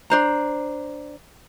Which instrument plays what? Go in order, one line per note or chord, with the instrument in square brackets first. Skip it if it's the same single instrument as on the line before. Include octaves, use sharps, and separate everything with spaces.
[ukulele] D4 C5 A#5